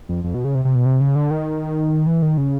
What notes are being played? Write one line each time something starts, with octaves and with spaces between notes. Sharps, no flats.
F2
F2
B2
C#3
C3
C3
B2
C3
C#3
D3
D#3
E3
D#3
C#3